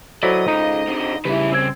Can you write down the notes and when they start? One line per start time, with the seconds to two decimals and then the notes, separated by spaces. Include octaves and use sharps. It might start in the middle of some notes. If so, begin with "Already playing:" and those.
0.23 F#3 E4 A4 C5 D5 D#5 B6
0.48 C#2 D#4
0.88 D3 C4
1.25 C#3 G3 E4 G4 B4
1.52 C4 E6 G#6